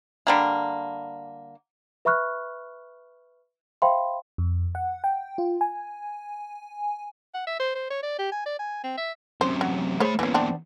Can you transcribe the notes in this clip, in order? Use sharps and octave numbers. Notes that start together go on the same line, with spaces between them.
D3 G3 A#3
B4 E5 B5 C#6 F6 F#6
C5 E5 F5 G5 B5 C6
F2
F#5
G5
F4
G#5
F#5
E5
C5
C5
C#5
D5
G4
G#5
D5
G#5
C4
E5
F#2 C3 C5
F#3
A3 G#4 C5 C#5 B5
E2 A#2 E3 C#4
B3 C4 D4